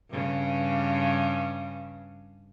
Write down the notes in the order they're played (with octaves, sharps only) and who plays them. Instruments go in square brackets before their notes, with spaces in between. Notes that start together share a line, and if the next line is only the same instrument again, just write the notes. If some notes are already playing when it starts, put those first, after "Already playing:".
[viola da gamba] G2 C#3